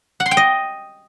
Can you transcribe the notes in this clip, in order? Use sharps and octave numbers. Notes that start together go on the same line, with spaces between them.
F#5
C6
G5
D#5